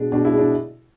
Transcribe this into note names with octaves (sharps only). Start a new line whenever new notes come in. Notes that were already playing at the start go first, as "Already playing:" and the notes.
Already playing: B2 G#3 D4
B2 D4
E4
G#3
D4